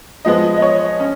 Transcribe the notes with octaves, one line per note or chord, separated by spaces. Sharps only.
F3 G#3 B3 D#5
D#5
C#5
C#4